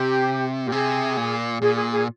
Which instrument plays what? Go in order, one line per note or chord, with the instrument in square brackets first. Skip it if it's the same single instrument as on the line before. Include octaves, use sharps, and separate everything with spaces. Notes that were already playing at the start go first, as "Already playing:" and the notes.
Already playing: [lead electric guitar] C3 [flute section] G4
[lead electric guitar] A#2 [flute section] G4
[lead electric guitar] C3 [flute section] G#4
[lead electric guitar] A#2
[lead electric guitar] A#2 [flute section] G#4
[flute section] G#4
G#4